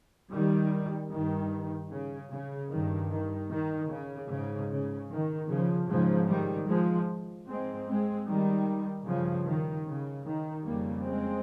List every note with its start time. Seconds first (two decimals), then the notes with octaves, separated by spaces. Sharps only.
0.32 D#3 G3
1.11 G2 D#3
1.91 C#3
2.31 C#3
2.71 G2 D#3
3.10 D#3
3.50 D#3
3.90 C#3
4.29 G#2 C#3
4.69 C#3
5.09 D#3
5.49 C#3 F3
5.88 G#2 C#3 F3
6.28 D#3 G3
6.68 F3 G#3
7.47 G#2 G#3 C4
7.87 G#3 C4
8.27 D#3 G3
9.06 G2 C#3 F3
9.46 D#3
9.86 C#3
10.25 D#3
10.65 F2 C#3 G3 A#3
11.04 G#3 C4